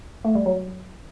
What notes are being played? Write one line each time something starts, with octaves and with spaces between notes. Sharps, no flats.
A3
G3
F#3